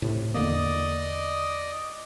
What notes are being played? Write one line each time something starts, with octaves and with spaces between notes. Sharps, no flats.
A2 C3
E2 D3 A#3 D5 D#5